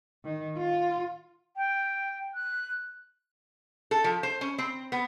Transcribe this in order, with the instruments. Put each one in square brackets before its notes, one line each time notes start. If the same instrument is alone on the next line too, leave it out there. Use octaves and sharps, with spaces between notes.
[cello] D#3
F4
[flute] G5
F#6
[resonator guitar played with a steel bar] A4
F3
C5
C#4
C4
B3